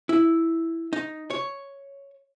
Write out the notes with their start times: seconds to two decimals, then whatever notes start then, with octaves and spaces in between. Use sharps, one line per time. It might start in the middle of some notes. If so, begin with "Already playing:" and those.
0.09 E4
0.93 D#4
1.30 C#5